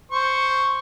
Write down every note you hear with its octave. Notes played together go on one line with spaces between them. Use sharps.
C5 C#6